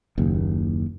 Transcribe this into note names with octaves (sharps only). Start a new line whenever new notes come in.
F#1 D#2